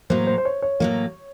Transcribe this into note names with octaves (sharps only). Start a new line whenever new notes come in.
A2 F#3 A#3 C5
C5
C5
C#5
C#5
A2 F#3 A#3